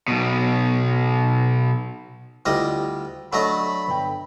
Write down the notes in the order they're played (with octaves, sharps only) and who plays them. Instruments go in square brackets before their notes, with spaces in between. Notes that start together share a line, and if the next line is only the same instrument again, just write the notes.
[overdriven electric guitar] B1 B2
[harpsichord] D2 G3 D#5 [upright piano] E4 F4
[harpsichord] F#3 A3 D#5 [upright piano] D4 A4 [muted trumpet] B5
[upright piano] G1 G5